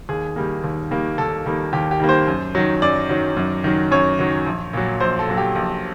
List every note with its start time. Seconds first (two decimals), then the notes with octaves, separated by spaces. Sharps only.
0.09 D#2 G#4
0.36 D#3 G3 A#3
0.64 D#2
0.91 D#3 G3 A#3
1.18 D#2 A4
1.46 D#3 G3 A#3
1.73 D#2 G4
1.91 G4
2.00 D#3 G3 A#3
2.09 C5
2.27 F#2
2.55 D#3 F#3
2.82 F#2 D5
3.09 D#3 F#3
3.37 F#2
3.64 D#3 F#3
3.91 F#2 C#5
4.19 D#3 F#3
4.46 A#1
4.73 A#2 F#3
5.00 A#1 C5
5.19 A4
5.28 A#2 F#3
5.37 G4
5.55 A#1